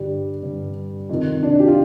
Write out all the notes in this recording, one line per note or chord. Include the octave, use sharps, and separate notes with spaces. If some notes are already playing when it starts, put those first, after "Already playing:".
Already playing: G2 D3 G3
G2 D3
F2 C3 D#3
D4
G4
F4